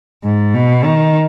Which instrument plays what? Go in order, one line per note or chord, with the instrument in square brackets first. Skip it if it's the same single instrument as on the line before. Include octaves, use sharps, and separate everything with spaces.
[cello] G#2
B2
D#3